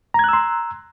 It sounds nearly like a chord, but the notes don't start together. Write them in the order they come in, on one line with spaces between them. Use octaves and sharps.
A#5 G#6 F#6 E6 C6